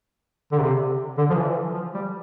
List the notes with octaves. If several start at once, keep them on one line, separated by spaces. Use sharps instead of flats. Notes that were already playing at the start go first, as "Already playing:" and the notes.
D3
C3
D3
F3
E3
F3
G3